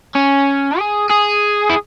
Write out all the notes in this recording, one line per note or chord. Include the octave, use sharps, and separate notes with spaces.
C#4
G#4
G#4
E4